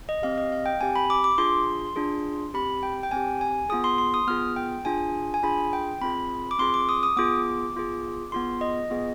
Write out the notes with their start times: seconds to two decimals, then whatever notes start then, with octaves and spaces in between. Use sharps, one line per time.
0.09 D#5
0.22 C4 G4 F5
0.38 D#5
0.52 F5
0.66 G5
0.81 C4 G4 G#5
0.95 B5
1.10 D6
1.24 D6
1.38 D4 F4 G#4 C6
1.96 D4 F4 G#4
2.54 C4 G4 B5
2.83 G5
3.03 G5
3.11 C4 G4 G#5
3.41 G#5
3.69 B3 F4 G#4 D#6
3.84 C6
3.98 C6
4.14 D#6
4.27 B3 F4 G#4 F6
4.56 G5
4.85 D4 F4 G#4 G#5
5.34 G#5
5.43 D4 F4 G#4 B5
5.73 G5
6.01 C4 F4 G#4 B5
6.51 D6
6.59 C4 F4 G#4 C6
6.74 D6
6.89 D#6
7.03 D#6
7.17 B3 F4 G#4 D6
7.74 B3 F4 G#4
8.32 B3 F4 G#4 C6
8.61 D#5
8.90 B3 F4 G#4